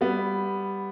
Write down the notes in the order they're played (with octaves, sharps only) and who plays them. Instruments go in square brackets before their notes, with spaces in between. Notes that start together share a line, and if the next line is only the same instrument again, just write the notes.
[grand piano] G3 B3